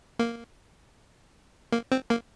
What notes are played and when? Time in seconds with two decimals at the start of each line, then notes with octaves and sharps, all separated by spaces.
0.19 A#3
1.72 A#3
1.92 C4
2.10 A#3